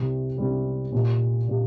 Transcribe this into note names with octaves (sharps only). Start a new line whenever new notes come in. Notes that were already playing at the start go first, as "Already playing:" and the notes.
Already playing: C2 C3 G3 C4
C2 C3 G3 C4
A#2 A#3 G4
A#2 A#3 G4